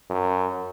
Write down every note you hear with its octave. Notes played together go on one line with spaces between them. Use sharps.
F#2